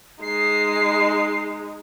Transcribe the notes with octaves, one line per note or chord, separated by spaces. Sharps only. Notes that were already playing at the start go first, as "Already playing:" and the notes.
G#3 D#4 C7